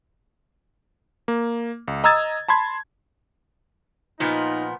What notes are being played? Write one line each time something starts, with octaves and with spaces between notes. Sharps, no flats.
A#3
C#2
D#5 A#5 D#6 E6 G#6 A6
A5 B5 C6 G#6
A#2 F3 B3 D#4